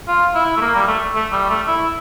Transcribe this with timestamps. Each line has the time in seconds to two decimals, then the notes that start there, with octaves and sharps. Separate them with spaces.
0.08 F4
0.35 E4
0.57 A3
0.61 A#3
0.75 G3
0.88 A3
1.15 A3
1.32 G3
1.49 A3
1.68 E4